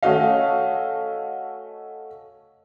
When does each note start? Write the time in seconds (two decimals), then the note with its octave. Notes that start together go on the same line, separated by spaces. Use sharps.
0.03 A3 C#4 F#4 D#5 F5